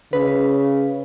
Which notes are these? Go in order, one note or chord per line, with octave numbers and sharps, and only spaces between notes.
C#3 B4